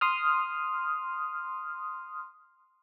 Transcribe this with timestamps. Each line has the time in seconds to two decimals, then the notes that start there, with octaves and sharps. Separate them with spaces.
0.01 C6 D#6 F6